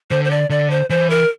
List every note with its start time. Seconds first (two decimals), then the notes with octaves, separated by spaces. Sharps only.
0.10 D3 C5
0.25 C5
0.31 D5
0.50 D3 D5
0.71 C5
0.90 E3 C5
1.10 A#4